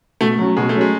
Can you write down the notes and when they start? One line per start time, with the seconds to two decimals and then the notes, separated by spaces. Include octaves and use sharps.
0.21 B2 A3
0.39 F#3 C#4 F#4
0.57 B2 G#3
0.69 A3
0.75 F#3 C#4 F#4
0.81 G#3